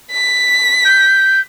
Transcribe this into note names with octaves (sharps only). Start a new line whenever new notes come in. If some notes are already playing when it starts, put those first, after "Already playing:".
B6
G6